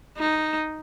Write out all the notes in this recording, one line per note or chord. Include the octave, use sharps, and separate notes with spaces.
D#4